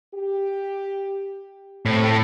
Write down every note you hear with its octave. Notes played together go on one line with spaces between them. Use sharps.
G4
A2 C3 A3 C4